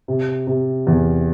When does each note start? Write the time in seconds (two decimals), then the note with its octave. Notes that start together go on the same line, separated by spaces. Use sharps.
0.08 C3
0.47 C3
0.87 E2